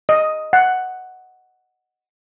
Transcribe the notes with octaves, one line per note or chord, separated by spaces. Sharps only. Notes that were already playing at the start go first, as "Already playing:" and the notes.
D#5
F#5